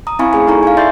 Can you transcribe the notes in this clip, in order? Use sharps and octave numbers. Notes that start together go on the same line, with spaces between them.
A#5 D#6
C4 E4 F5 G#5 B5 C#6
A3 C#4 G#4 G#5
D#4 E4 A4 A#5 C#6
F5 G#5
D5 E5 C6 G6 A6